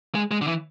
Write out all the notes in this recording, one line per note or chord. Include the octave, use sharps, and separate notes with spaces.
G#3
G#3
D3
E3